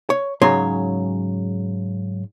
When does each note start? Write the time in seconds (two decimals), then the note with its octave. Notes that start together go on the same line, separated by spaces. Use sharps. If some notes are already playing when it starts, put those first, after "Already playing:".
0.10 C#5
0.41 G#2 C#3 F#3 C#5 C6